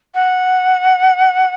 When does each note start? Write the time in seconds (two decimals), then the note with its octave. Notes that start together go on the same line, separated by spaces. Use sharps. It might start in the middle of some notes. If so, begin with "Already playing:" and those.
0.15 F#5